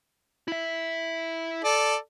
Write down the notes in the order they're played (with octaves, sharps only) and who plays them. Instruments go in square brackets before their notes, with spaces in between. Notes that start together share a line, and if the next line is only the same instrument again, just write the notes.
[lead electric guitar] E4 E5
[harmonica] A4 D5